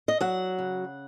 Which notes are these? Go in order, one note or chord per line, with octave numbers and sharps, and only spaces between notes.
D#5
F#3 F#5
C#3